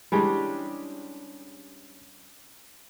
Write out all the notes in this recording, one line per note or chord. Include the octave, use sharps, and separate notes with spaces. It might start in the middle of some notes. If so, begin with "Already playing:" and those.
E3 G3 G#3 C#4 D4 G4